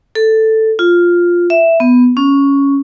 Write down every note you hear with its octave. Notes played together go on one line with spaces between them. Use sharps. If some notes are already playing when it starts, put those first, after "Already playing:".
A4
F4
E5
B3
C#4